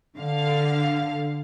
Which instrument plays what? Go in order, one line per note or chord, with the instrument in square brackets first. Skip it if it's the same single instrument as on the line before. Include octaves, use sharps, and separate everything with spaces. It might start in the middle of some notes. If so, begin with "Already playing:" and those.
[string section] D3 F5